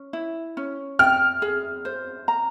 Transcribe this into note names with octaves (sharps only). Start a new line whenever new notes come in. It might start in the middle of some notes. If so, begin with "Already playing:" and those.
Already playing: C#4
E4
C#4
G5 F6
G#4
C5
A#5